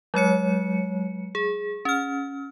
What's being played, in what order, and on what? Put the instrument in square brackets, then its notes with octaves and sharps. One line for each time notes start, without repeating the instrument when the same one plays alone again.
[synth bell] F#3 G#3 C#5 C#7
G#4
C#4 F6